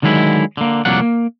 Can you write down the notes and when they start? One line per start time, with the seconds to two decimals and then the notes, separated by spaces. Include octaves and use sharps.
0.02 D3 D#3 F#3 G#3 E4
0.57 D3 A#3
0.85 C2 F2 F#3 A#3 D4 F#5
1.01 A#3